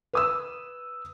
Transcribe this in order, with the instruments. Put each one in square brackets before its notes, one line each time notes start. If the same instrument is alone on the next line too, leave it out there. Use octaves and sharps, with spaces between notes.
[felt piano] B4 D#6 E6